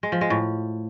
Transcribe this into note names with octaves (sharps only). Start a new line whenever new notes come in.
G#3
F3
G#3
A2